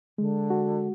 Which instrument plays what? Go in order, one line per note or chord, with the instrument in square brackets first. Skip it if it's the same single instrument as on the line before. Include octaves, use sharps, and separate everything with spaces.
[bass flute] D3 [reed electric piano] G#3
[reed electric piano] F#4